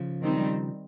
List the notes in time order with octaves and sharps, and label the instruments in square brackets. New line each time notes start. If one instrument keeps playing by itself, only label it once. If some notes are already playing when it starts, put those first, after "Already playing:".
Already playing: [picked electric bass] C#3 F3
[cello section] D#3 G3 C4 D#4